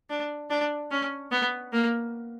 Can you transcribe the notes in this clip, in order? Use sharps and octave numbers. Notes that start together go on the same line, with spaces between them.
D4
D4
C#4
B3
A#3